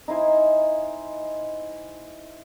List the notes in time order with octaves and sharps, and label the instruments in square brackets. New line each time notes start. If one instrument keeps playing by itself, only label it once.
[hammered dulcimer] D#4 E4 C5 G#5